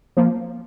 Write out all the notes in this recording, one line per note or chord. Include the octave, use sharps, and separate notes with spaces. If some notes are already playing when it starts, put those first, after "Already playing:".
F3 A#3